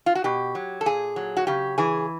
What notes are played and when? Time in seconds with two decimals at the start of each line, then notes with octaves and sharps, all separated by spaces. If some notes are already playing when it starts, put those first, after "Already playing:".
0.06 F4
0.15 F#4
0.24 B2 G4
0.55 F#3
0.81 A4
0.86 A#2 G#4
1.16 F#3
1.37 F#4
1.47 C#3 G4
1.78 E3 G#4